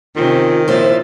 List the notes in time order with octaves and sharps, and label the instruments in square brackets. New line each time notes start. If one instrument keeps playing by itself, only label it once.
[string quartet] C3 C4 C#4 [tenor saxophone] D#3 [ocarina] F4
[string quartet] A#2 F3 A6 [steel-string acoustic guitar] E4 C5 [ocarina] C#5